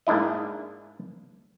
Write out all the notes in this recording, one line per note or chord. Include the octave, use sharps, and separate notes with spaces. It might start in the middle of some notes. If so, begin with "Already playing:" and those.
G#2 A#3 D4 E4 D#5